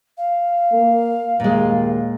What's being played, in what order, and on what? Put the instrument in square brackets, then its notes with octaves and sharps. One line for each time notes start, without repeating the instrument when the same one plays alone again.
[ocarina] F5
[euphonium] A#3
[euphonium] D#2 [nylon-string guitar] A#2 G#3